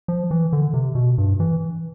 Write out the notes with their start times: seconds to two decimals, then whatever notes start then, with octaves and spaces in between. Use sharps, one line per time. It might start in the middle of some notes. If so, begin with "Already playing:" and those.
0.08 F3
0.31 E3
0.53 D3
0.74 C3
0.95 B2
1.18 G2
1.40 E3